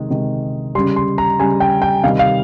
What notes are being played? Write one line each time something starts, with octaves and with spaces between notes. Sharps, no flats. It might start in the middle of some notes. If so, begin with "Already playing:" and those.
Already playing: C3 D#3 G#3
C3 D#3 G#3
C#3 G3 C6
C6
A#5
C#3 G3 G#5
G5
G5
C3 D#3 G3 F5
F5